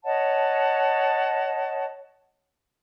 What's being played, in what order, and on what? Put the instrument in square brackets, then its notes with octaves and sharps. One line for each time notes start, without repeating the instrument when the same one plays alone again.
[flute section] C#5 D#5 F#5 A5